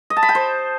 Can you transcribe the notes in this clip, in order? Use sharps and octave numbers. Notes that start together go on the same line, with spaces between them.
D#5
A5
B5
G5
C5